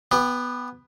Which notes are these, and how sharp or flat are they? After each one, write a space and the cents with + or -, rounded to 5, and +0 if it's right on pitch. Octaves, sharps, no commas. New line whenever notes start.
B3 +0 G4 +25